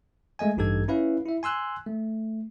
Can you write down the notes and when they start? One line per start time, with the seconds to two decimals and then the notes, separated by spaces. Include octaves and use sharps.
0.39 G#3 A3 D#5 G#5
0.57 A1 G2 D#4 G4 A4 G#6
0.88 C#4 E4 B4 F5
1.25 E4 E5
1.43 G#5 C6 E6 F#6
1.86 A3